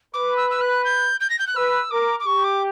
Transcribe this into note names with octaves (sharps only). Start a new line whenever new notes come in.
B4 D6
E6
E6
F#6
G6
G6
A#6
G6
F#6
B4 E6
A#4 D6
D6
G4 C#6
D6